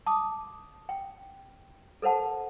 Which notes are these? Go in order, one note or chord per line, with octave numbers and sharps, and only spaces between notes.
A5 D6 D#6
G5
A4 A#4 C5 F#5 A5